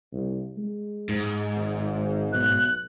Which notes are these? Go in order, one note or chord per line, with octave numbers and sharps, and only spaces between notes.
C2
G#3
G#2
G#1
B1 F#6